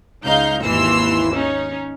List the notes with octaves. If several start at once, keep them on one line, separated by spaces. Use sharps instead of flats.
C#2 D#4 F5 G6
G#1 D#2 E3 C6 E6 C7
C#4 D#4